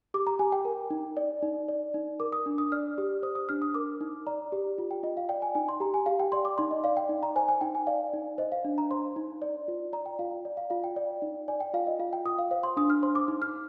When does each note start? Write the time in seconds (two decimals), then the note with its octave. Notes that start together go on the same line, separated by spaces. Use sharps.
0.14 G4 D6
0.27 A#5
0.39 G4 G#5
0.52 G5
0.65 A#4
0.90 D#4
1.17 D5
1.43 D#4
1.69 D5
1.94 D#4
2.20 A#4 D6
2.32 D#6
2.46 D4
2.58 D#6
2.72 D5 F6
2.98 G4
3.23 C5 D#6
3.35 D#6
3.49 D4 F6
3.62 D#6
3.74 A#4 D6
4.01 D#4
4.27 D5 A#5
4.52 G4
4.78 F4
4.91 G5
5.03 F4 D#5
5.17 F5
5.29 D5 G5
5.42 G#5
5.55 D#4 G#5
5.68 C6
5.80 G4 A#5
5.94 G#5
6.06 G4 F5
6.19 G5
6.32 D5 C6
6.45 D6
6.58 D#4 C6
6.71 D#5
6.84 D5 F5
6.97 G5
7.09 D#4
7.23 A#5
7.36 C5 G#5
7.48 G#5
7.61 D#4 G5
7.75 G#5
7.87 D5 F5
8.13 D#4
8.38 C5 D#5
8.52 F5
8.65 D4
8.78 A#5
8.91 C5 C6
9.16 D#4
9.42 D5
9.68 F4
9.93 D5 A#5
10.06 G5
10.19 F4 F5
10.45 D5
10.57 F5
10.70 F4 F5
10.84 G5
10.96 D5
11.22 D#4
11.48 D5 G#5
11.60 G5
11.74 F4 F5
11.87 D#5
11.99 F4 F5
12.13 G5
12.25 F4 D#6
12.39 F5
12.51 C5 F5
12.63 C6
12.77 D4 D#6
12.90 F6
13.03 C5 C6
13.15 D6
13.28 D#4
13.42 F6